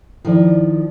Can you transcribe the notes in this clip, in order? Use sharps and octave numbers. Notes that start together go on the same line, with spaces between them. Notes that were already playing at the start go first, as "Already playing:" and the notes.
D#3 F3 E4 A4 D5